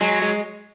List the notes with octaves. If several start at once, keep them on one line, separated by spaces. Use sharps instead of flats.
F#3 G#3
G#3